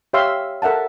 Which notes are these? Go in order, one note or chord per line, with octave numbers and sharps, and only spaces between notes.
G4 C#5 E5 F5 C6 E6
A4 A#4 E5 F#5 A5